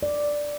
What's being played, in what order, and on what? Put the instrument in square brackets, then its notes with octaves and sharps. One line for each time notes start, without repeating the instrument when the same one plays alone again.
[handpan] D5